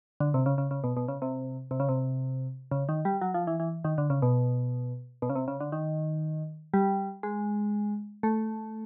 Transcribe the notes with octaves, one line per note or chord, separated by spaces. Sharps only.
D3
C3
C#3
C#3
C#3
B2
B2
C#3
C3
C3
C#3
C3
C#3
D#3
G3
F#3
F3
E3
E3
D#3
D3
C#3
B2
B2
C#3
C3
C#3
D3
D#3
G3
G#3
A3